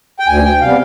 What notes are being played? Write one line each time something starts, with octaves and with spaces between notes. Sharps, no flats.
G5
D2 G#5
G5
C3 G3 B3 F5